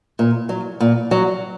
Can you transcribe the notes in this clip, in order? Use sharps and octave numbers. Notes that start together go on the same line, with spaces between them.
A#2
F#3
A#2
F#3